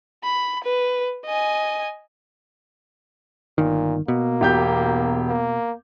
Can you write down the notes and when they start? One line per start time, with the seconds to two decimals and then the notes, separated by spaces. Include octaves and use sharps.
0.24 B5
0.64 B4
1.26 D#5 G#5
3.58 G1 A#2 D#3
4.08 B2 A#3
4.41 E1 G4 G6
5.29 A#3